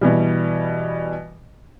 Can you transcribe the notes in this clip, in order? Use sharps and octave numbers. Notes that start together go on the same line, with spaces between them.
B2 E3 G3